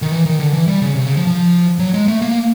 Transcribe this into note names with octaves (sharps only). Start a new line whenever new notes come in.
D#3
E3
D#3
D3
E3
G3
C#3
C3
C#3
F3
F3
F#3
G#3
A3
A#3